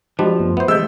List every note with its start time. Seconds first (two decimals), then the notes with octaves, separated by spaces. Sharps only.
0.19 F3 G3 G#3 D4 F#4 D#5
0.40 F#2 A3 B3
0.57 B3 C5 E5
0.68 C3 E3 G#3 A3 D#5 E6 G6